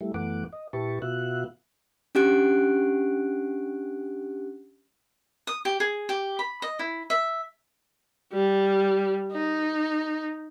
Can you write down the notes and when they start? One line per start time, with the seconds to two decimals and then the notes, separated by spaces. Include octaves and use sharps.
0.01 G3 A3 E4
0.14 F#2 E3 A3 B3 F#5 D6
0.53 D#5
0.73 A#2 E4 G4 B4 A5 C#6
1.02 B2 B3 F4 F#4 E5 F#6
2.15 C#4 D4 G4 F#5 F#6 D7
5.47 D#6
5.65 G4
5.80 G#4
6.09 G4
6.39 B5
6.62 D#5
6.79 E4
7.10 E5
8.33 G3
9.32 D#4